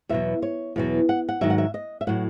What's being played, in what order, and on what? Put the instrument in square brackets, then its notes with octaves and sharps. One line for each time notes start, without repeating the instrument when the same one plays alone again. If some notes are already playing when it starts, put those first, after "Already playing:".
[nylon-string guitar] E2 B2 F#3 E5
C#5
E2 B2 F#3
F#5
F#5
G#2 D#3 F#3 E5
F#5
E5
D#5
E5
A2 F#3 F#5